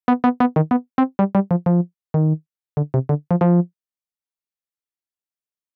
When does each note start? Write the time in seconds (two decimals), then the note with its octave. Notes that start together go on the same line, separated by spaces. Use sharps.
0.08 B3
0.24 B3
0.40 B3
0.56 D#3
0.71 B3
0.98 C4
1.19 G3
1.35 G3
1.51 F3
1.66 F3
2.14 D#3
2.77 D3
2.94 C3
3.09 D3
3.31 F3
3.41 F3